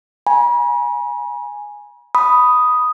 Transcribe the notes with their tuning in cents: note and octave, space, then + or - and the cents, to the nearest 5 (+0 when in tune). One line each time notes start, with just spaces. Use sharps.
G#5 +0 B5 -45
B5 +0 D#6 +0